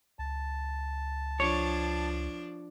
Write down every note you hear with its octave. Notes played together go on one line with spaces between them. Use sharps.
C#2 A5
F3 D4 C#5